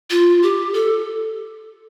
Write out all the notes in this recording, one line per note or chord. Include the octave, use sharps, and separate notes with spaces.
F4
G4
A4